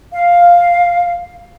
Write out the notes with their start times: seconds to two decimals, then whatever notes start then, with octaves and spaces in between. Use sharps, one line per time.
0.13 F5